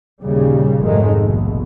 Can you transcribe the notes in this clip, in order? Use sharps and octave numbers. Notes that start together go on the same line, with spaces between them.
D#2 A#2 C#3 G3
F1 G#2 D#3 G#3 A3
A#1 B2